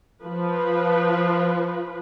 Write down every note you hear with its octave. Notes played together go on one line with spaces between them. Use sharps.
F3 B4